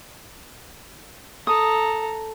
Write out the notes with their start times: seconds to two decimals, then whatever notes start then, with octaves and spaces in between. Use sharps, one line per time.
1.47 A4 A#5 D#6